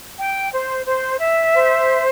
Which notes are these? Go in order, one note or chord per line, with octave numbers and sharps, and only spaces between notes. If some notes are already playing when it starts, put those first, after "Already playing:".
G5
C5
C5
E5
C5